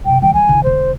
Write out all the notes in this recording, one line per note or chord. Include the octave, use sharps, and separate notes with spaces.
F#2 C3 G5
D#3 G3 G5
F3 G3 G#5
D3 E4
E1 D3 C5